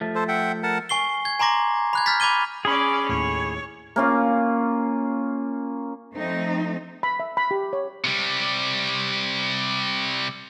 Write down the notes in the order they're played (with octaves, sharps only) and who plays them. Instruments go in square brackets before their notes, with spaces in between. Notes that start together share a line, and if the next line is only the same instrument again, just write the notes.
[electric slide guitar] F3 A3
[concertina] A4 C5
E5 F#5 G5
A#4 F#5 A5
[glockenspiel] G#5 C#6 C7 G7
G#6
G#5 A#5 C6 D6 A#6
B5 F#6 G#6
F6 G6 A6 B6
B5 D6 G#6 D#7 G7
[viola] C#4 D5 [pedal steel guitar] G#4 B5
[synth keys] D#2 A2 [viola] C#5
[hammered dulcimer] A#3 C#4 F4
[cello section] F3 A3 C4 D#4
[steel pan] B5
E5
B5
G4
C#5
[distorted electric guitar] C3 G3